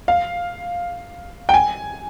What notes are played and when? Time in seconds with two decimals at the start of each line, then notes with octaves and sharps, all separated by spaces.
0.08 F5
1.49 G5
1.54 G#5